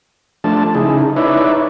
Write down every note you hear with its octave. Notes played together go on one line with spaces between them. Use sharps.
F3 A3 D4 A5
C#3 D#4 E4 G#4
D#4 E4 B4 C#5 D5 E5